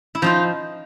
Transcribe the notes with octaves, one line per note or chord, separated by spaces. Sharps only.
E4
F3 D#4 F4